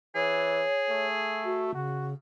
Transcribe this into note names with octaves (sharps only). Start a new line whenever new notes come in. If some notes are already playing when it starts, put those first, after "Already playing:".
E3 G#4 C#5
A3
F#4
C#3 F#4